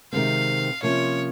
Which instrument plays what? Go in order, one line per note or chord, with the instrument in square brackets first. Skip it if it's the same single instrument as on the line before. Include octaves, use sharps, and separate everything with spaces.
[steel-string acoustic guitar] C3 D#3 G#3 C4 [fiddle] F5
[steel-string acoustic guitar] C3 F3 A#3 C#4 [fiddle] C#5